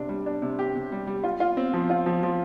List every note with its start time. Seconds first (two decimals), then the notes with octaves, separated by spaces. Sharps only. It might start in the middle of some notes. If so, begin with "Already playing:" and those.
Already playing: C3 D4
0.09 G3
0.26 D4
0.42 C3
0.59 G4
0.75 C3
0.92 G3
1.07 G3
1.24 F4
1.40 F4
1.57 C4
1.74 F3
1.90 F4
2.06 F3
2.23 F3